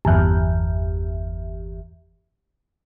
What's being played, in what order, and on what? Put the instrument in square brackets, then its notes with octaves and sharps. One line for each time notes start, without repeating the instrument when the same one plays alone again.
[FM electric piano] G1 E2